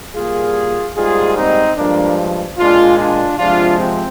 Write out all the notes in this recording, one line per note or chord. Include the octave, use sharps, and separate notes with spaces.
A#2 G3 A#3 F4 G#4
G#2 G3 A#3 F4 G#4
C4 D#4
G2 F3 G#3 A#3 D4
A#2 G#3 D4 F4
D4 F4
C3 F3 G#3 D4 F4
C4